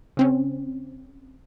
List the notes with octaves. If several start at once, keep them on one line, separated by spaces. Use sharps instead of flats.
C#3 C4 C#4